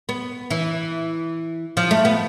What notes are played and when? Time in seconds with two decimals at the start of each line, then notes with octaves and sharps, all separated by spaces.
0.09 B3
0.50 E3
1.77 F3
1.91 A3
2.05 B3